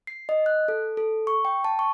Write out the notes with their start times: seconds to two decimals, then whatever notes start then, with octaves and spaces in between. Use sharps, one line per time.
0.07 C7
0.29 D#5
0.46 F#6
0.68 A4
0.97 A4
1.27 C#6
1.45 G5
1.65 A5
1.79 C#6